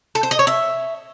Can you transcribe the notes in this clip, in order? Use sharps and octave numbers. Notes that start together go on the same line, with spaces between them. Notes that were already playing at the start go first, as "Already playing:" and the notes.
A4
C5
D#5
C#5
E5